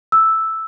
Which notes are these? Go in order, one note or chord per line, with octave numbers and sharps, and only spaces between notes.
E6